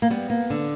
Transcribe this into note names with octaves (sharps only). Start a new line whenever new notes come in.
A#3
G3 B3
A#3
D3